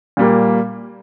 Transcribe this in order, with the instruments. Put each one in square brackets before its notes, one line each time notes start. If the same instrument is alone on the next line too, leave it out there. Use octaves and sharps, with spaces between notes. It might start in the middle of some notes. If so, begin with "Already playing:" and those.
[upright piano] A#2 G3 A#3